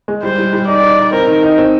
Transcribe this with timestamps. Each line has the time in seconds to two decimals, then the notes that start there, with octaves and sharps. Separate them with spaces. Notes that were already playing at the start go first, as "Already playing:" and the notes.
0.08 G#3
0.23 G3 C5
0.38 G3
0.53 G3
0.67 D#4 D5
0.83 D#4
0.98 D#4
1.13 C4 A#4
1.27 D#3
1.43 D#4
1.58 C4